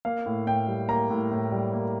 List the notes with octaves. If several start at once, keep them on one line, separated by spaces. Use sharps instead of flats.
A#3 F5
A2
A2 G5
G3
A#3 A#5
A2
A2
G3
A#3